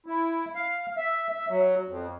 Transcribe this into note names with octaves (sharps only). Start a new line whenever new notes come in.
E4
F5
E5
E5
F#3
F2